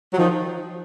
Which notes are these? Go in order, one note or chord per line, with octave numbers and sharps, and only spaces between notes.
F#3
D#3 F3